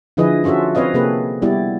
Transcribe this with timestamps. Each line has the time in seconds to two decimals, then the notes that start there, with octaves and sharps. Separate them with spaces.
0.17 D3 F3 E4 G#4 B4 D#5
0.44 C#4 F4 F#4 A4 E5
0.75 C4 B4 C#5 D#5 F5
0.94 C3 A#3 G#4 A4 B4
1.42 G3 B3 E4 G4 D5